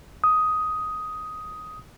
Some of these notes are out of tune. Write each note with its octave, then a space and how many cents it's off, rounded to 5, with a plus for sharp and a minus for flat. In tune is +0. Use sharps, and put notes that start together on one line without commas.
D#6 +10